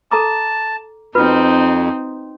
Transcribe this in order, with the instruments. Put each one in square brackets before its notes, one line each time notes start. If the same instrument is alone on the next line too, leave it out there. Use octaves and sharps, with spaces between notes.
[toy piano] A4 A#5 D6 [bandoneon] A5
[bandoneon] F2 [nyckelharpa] C4 D#4 [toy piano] F4 F#4 B4